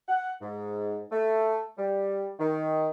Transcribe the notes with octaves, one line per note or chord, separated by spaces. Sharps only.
F#5
G#2
A3
G3
D#3